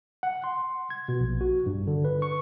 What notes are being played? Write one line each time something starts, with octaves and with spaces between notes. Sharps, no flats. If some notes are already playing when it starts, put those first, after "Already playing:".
F#5
C6
G#6
B2
A#1
F#4
G2
D3
B4
C#6